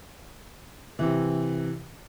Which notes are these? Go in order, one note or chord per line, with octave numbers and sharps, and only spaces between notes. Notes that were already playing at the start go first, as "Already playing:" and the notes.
C3 E3